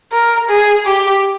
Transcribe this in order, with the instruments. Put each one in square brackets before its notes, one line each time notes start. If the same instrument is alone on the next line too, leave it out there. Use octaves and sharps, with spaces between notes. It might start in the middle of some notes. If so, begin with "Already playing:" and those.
[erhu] A#4
G#4
G4